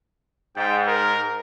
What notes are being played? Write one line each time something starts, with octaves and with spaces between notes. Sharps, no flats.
G#2 G5
A#4